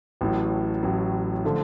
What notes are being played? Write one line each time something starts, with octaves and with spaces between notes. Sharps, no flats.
A1 A2 F#3
A1 A2 F#3
D3 F3 A3